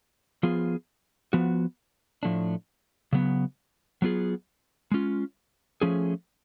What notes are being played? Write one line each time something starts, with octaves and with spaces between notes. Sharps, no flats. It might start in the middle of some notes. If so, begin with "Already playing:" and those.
F3 B3 F4 G#4
F3 B3 F#4
A2 F3 A3 D4
C#3 F#3 B3
F#3 B3 F4 G#4
G#3 C#4 F4
F3 A3 C#4 G#4